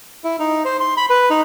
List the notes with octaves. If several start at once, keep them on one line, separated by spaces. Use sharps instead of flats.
E4
D#4
C5
C6
B5
B4
D#4